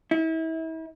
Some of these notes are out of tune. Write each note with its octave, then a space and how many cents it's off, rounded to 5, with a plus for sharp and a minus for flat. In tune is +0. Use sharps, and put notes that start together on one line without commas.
E4 -35